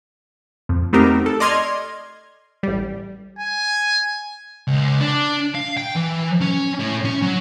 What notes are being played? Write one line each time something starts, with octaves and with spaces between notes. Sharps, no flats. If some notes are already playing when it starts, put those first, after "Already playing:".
F2
A3 B3 C4 D#4 G4 A#4
A4
D5 D#5 C6 F6 G#6
A1 G3
G#5
C#2
D4
F5
G5
E3
C#4
A2
C#4
F#3